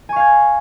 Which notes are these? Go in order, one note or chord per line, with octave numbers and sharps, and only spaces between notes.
F5 G#5 C#6 G#6